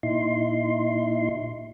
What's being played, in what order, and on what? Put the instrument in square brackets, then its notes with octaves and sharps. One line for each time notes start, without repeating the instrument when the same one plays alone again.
[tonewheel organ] A#2 D#4 E4 C6